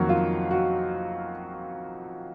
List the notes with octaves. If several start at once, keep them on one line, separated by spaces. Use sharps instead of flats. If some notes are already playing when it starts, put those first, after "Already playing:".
Already playing: F2 D#3 F#3 A#3 F#4
F4
F#4